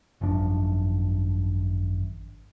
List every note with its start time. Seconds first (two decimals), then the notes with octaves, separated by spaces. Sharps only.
0.21 G#1 F#2 F3 D4